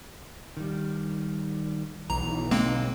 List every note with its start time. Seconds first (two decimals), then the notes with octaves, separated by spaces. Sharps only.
0.57 D#3 G3
2.10 B1 E3 A#5
2.51 D3 G#3 A#3 C4 D#4